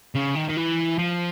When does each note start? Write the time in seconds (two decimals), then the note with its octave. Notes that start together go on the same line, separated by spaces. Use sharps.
0.15 C#3
0.35 D#3
0.49 D#3
0.57 E3
0.98 F3